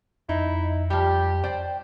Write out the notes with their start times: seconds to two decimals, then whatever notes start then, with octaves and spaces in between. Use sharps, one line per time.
0.29 F2 D#4 E4
0.90 F3 G3 G4
1.44 C5 D5 G5